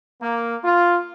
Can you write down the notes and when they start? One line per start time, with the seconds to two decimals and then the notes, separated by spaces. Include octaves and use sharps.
0.21 A#3
0.64 F4